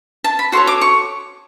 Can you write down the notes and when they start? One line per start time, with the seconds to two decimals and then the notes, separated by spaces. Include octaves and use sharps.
0.24 A5
0.39 B5
0.52 F#4 A4 C#5 C6
0.67 D6
0.81 C#6